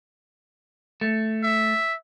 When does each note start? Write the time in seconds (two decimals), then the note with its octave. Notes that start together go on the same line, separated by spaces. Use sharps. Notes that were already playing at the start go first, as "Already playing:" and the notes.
1.01 A3
1.43 E5